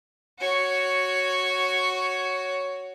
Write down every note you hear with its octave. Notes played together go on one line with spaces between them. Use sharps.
F#4 C#5